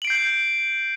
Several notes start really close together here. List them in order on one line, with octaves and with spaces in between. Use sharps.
F#7 D7 C7 G6